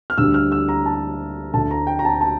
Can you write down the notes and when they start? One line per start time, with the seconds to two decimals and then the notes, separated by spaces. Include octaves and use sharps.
0.10 F6
0.18 D2 D3 G3 D4 E6
0.34 F6
0.52 E6
0.69 A#5
0.86 A5
1.53 D2 D3 A3 A5
1.71 A#5
1.87 G5
1.99 A#5
2.05 A5
2.21 A5